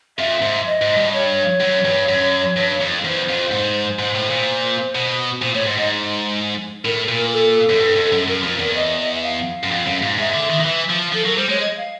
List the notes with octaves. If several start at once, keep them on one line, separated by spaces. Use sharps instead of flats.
F2 E5
G#2
D#5
G#2
G2
C#5
F#2
G2
F#2
G2
F2
E2 C5
F2
G#2
G#2 C5
A2
A#2
B2
A#2 C5
A2 C#5
G#2
G#2 D#5
A2 A#4
A#2
A4
F#2
G2
F2
F#2
F#2 A#4
F2
E2
D#5
E5
F5
F#2
F2
F#2
G#2
G#2 E5
D3
D#3
D#3
E3 E5
F3
F3 A4
F#3 A#4
G3 C5
G#3 C#5
D#5
F5